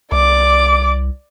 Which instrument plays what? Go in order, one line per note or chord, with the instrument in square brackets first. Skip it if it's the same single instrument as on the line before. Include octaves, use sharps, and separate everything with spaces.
[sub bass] C2 [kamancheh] D5 D6